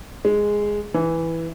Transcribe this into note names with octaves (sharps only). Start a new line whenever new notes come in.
G#3
E3